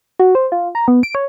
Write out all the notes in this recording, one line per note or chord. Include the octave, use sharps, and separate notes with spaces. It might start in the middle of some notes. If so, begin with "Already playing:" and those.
F#4
C5
F4
A#5
B3
D7
C#5